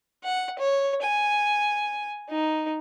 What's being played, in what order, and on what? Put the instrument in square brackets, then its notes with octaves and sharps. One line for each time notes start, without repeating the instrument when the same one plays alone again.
[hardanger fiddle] F#5
C#5
G#5
D#4